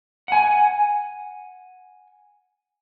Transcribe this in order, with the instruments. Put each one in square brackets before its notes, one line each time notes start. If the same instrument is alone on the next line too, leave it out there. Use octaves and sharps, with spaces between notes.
[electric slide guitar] F#5 G#5